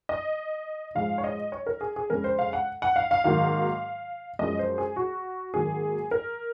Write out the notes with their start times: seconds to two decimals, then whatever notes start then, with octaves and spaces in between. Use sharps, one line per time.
0.09 D#5
0.95 G#2 F3 G#3 F5
1.18 C#5
1.24 D#5
1.52 C#5
1.66 A#4
1.81 G#4
1.96 G#4
2.10 F2 C#3 G#3 A#4
2.24 C5
2.39 F5
2.53 F#5
2.82 F#5
2.96 F5
3.11 F5
3.24 G#2 D#3 F#3 A#3 F5
4.39 F#2 F3 G#3 D#5
4.59 C5
4.78 G#4
4.96 F#4
5.54 G#2 D#3 F#3 A#3 G#4
6.11 A#4